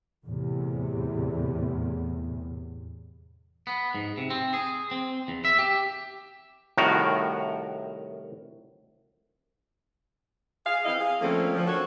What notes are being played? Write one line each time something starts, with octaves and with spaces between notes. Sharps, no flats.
E2 A2 C3
B3
G#2
C3
C4
G#4
C4
E2
E5
G4
C2 A2 D#3 F#4 A#4
G#4 F5
E3 C4 E4 D#5 F5
G#4 F5
D3 F3 A3 A#3 C4 C#4
F3
C4 D4 F#4 A4 A#4 C#5